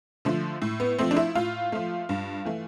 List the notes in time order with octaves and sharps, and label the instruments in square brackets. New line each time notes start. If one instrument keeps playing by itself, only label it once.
[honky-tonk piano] D3 F3 A3
A2
B3
F3 A3 C4
D4
E4
A2 F4
F3 A3
G2
E3 A3